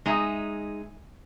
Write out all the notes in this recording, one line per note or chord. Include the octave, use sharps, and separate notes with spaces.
G#3 D#4 G#4 E5